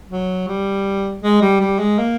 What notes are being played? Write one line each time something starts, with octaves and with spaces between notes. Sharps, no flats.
F#3
G3
G#3
G3
G3
G#3
A#3